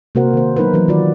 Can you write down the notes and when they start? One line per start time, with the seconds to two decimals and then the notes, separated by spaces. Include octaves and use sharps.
0.15 C3 A#3 F#4 A#4 C5 F#5
0.34 D#3 C5
0.56 F#3 B3 D#4 E4 A#4 B4
0.74 E3 F#3 D4 B4
0.88 D#3 F4 F#4 D5